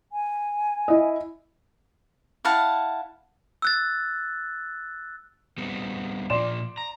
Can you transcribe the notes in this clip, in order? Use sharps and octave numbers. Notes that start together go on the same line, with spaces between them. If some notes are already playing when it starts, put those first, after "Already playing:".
G#5
E4 D#5
E4 F5 F#5 A5
E6 F#6 A6
G3 B3 C4
A#2 F3 F4 D5 C6 E7
A#5